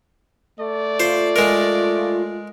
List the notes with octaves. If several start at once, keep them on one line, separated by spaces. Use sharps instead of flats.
A3 D5
F4 C5
G#3 A#4